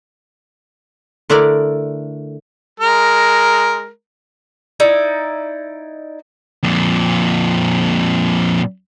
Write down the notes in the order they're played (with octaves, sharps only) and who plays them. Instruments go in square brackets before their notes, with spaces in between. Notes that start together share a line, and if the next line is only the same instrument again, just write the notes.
[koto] D3 A3 D4 E4 A#4 D5
[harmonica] G#3 A#4
[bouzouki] D#4 E4 D5
[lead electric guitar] F2 A#2